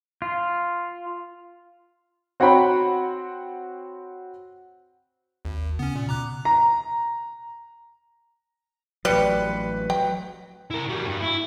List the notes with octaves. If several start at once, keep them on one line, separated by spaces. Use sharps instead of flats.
F4
C4 F#4 C#5 F#5 G5 B5
G#1 D#2
C#3 B3 C#4
A#2
B2 A#5 D6 F#6
A#5
A1 F#3 G3 B4 C#7
F#3 G5
E4 A#4
F#3 G3
G2
E4